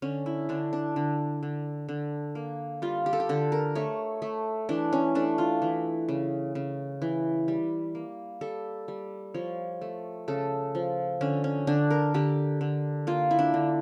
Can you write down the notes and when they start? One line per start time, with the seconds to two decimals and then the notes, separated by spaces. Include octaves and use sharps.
0.02 D3 C#4
0.26 E4
0.49 D3 D4
0.73 D4
0.96 D3
1.43 D3
1.89 D3
2.35 A#3
2.82 G3 F4
3.06 G4
3.13 A4
3.20 G4
3.29 D3 A4
3.52 A#4
3.75 A3 C#5
4.22 A3
4.69 E3 D4
4.93 C#4
5.15 A3 D4
5.38 F4
5.62 E3
6.09 C#3
6.55 C#3
7.02 E3
7.48 G3
7.95 A#3
8.41 G3 A4
8.88 G3
9.34 F3 C#5
9.81 A3
10.28 C#3 A4
10.75 F3
11.21 D3 C#4
11.44 C#4
11.67 D3 D4
11.91 A#4
12.14 D3 G4
12.61 D3
13.07 A#3 F4
13.31 E4
13.39 D4
13.54 D3